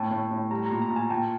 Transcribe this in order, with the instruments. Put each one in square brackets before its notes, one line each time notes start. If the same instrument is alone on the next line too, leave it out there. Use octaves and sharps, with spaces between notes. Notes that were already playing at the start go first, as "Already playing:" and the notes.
Already playing: [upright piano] A2 [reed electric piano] G5 A5
[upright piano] A2
A2
[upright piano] G3 [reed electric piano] A#5
[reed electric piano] A#5
[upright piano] A#2
[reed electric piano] A#5
[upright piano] A#2
[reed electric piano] G#5 A#5
[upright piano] A#2 [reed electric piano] G5 A5